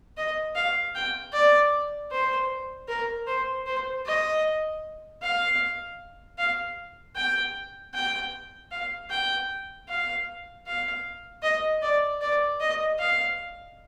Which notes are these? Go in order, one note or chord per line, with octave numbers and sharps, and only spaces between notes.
D#5
F5
G5
D5
C5
A#4
C5
C5
D#5
F5
F5
G5
G5
F5
G5
F5
F5
D#5
D5
D5
D#5
F5